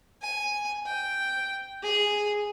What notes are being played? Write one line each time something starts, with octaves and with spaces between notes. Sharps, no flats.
G#5
G5
G#4